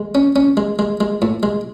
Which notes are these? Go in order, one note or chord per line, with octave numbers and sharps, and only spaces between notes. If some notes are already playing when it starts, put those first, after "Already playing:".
Already playing: G#3
C#4
C#4
G#3
G#3
G#3
A2
G#3